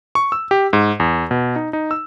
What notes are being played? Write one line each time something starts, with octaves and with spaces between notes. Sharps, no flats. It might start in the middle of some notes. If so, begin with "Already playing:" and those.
C#6
E6
G4
G#2
E2
B2
D#4
D#4
E6